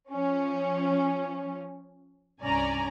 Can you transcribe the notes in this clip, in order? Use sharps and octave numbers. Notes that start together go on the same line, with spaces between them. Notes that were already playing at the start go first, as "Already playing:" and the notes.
F3 C#4
C2 G2 C#4 D5 G#5 A#5